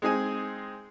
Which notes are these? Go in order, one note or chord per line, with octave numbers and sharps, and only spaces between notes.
G#3 C4 D#4 G#4 G#5